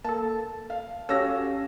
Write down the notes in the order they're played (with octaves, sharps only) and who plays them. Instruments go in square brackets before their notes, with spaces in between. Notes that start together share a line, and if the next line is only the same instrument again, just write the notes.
[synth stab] A#3 A4 [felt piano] A5
[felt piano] F5
[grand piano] C#4 F5 [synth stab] F#4 G4 A4 [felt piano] E6 A#6